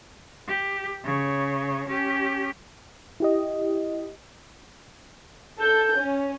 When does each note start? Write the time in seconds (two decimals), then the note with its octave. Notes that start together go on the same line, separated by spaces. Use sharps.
0.48 G4
1.04 C#3 C#5
1.88 C#4 G4
3.20 E4 G4 D#5
5.60 A4 G6
5.99 C#4